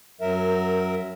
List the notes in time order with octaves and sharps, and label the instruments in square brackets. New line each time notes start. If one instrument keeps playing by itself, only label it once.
[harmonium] F#2 F#3 A#4 E5